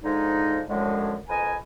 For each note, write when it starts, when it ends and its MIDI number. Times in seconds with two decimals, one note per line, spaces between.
0.04 0.61 44
0.04 0.61 50
0.04 0.61 53
0.04 0.61 56
0.04 0.61 63
0.70 1.16 42
0.70 1.16 45
0.70 1.16 50
0.70 1.16 53
0.70 1.16 56
1.28 1.55 41
1.28 1.55 70
1.28 1.55 71
1.28 1.55 75
1.28 1.55 80